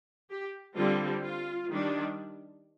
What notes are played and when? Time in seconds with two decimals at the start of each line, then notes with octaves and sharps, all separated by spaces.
0.31 G4
0.77 D3 G3 C4 F4
1.23 F4
1.68 D#3 G3 D4